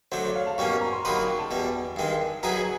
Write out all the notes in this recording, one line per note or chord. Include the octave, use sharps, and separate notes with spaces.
F#3 A3 D4 C5
C#5
F5
A5
B2 G3 A#3 C#4 C#6
C#6
A#5
C6
F#3 A#3 D#4 G4 B4 B5
C#6
G5
A5
E2 B2 G3
G2 D#3 G#3 C4
B2 F#3 B3 E4 G#4 A#5